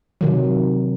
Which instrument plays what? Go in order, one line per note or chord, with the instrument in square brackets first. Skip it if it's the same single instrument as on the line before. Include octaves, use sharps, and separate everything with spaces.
[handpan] C3 D#3 F#3